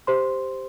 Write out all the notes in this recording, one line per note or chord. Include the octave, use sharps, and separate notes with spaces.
G4 C5 C6